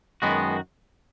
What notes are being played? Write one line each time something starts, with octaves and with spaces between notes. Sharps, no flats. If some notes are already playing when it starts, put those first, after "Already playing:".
F#2 D#3 G#3 B3 F#4